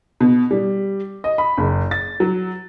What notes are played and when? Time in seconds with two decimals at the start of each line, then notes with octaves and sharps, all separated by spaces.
0.20 B2
0.51 G3
1.24 D#5
1.38 B5
1.57 F#1
1.91 A6
2.20 F#3